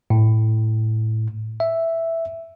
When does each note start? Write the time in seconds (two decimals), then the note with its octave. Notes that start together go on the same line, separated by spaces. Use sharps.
0.10 A2
1.60 E5